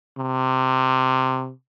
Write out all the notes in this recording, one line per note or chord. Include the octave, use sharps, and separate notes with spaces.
C3